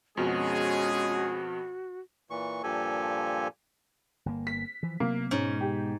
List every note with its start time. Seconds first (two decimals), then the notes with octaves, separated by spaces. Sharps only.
0.17 F2 B2 G#3 C#4 F#4 G#4
2.30 A#2 E3 C#6
2.63 G2 A#2 F3 G4 A4 G#5
4.26 G1 B2 A#3
4.47 B6
4.83 E3 F3
5.00 C3 F#3 A#3 B3
5.31 G#2 B2 G#3 C#4
5.60 G4